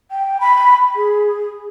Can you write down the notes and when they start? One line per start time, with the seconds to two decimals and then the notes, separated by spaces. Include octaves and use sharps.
0.11 G5
0.40 B5
0.95 G#4